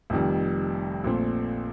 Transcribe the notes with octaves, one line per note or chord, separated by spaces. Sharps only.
F1 F2 D#3 G3
A#1 A#2 A3 C4